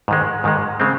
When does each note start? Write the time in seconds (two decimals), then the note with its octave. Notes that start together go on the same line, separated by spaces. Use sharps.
0.08 G#2 D#3 G#3
0.44 G#2 D#3 G#3
0.80 C#3 G#3 C4